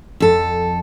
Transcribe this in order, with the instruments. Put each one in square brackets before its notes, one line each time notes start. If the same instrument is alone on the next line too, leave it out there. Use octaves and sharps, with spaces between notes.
[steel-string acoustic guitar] F2 A4